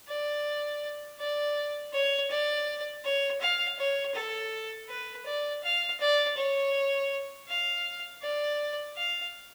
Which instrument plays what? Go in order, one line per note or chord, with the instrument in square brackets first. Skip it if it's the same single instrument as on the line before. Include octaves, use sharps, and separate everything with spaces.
[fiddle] D5
D5
C#5
D5
C#5
F5
C#5
A4
B4
D5
F5
D5
C#5
F5
D5
F5